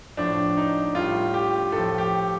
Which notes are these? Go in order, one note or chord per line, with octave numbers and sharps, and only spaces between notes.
A2 F3 D4
D#4
A2 G3 F4
G4
A2 F3 A4
G4